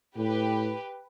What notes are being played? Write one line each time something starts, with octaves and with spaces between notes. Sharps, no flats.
A2 G4 B4